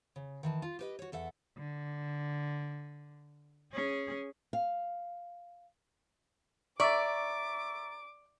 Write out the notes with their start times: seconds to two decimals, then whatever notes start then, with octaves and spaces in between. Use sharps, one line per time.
0.16 C#3
0.43 D#3 E3 A5
0.62 F4
0.79 G4 B4 D#5
0.99 F#4 C#5
1.12 E2 A4 E5 F#5
1.57 D3
3.73 C#4 G#4
4.53 F5
6.80 D5 E5 A#5 C#6 D6 A6